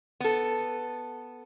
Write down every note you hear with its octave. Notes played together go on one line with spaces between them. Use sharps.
B3 A4